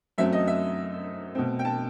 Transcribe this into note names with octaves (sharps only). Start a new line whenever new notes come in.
F#2 F#3 A3 C4 E5
D#5
E5
B2 A3 C4
G5
A5